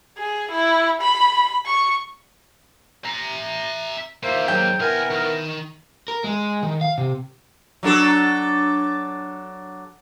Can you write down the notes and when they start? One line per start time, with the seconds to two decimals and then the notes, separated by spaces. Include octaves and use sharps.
0.18 G#4
0.52 E4
1.01 B5
1.66 C#6
3.04 E5 A#5
4.23 D#3 A#3 F4 C5 E5
4.48 G#2 F#3 G5
4.80 C2 B3 E4 A#4 G#5
5.10 D#3
6.08 A#4
6.24 G#3
6.63 D#3
6.81 F5
6.98 C3
7.83 F#3 D4 A4